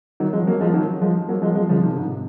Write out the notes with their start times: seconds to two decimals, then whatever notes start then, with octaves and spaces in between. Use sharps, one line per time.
0.20 D#3 F#3
0.33 F3 G#3
0.47 F#3 A#3
0.60 F3 G#3
0.74 D#3 F#3
1.01 F3 G#3
1.28 F#3 A#3
1.42 F3 G#3
1.55 F3 G#3
1.69 C#3 F3
1.83 C3 D#3
1.96 G#2 C3
2.10 C3